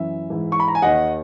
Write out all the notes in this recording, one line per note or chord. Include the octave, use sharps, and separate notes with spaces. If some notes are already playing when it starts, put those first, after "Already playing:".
Already playing: F#2 E3 E5
G#2 E3
C#6
B5
A#5
G#5
D#2 D#3 D#5 F#5